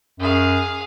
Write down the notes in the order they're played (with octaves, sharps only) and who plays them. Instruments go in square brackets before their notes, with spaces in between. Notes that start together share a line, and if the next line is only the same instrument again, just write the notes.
[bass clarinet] F#2 [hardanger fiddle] G#4 F5